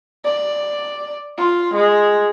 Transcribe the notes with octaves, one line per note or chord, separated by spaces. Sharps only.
D5
F4
G#3